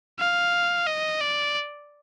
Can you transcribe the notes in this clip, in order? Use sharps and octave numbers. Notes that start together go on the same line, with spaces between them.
F5
D#5
D5